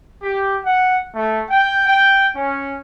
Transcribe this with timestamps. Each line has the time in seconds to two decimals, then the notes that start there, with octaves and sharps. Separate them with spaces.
0.22 G4
0.64 F#5
1.15 A3
1.49 G5
1.87 G5
2.35 C#4